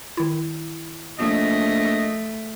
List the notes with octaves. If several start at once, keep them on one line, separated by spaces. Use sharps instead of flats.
D#3 E4
A#1 A3 D#5